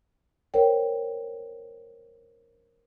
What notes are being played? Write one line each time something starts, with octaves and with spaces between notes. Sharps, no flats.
A#4 C5 C#5 G5